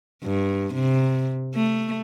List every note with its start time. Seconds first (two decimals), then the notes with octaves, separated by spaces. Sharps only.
0.24 G2
0.74 C3
1.55 A3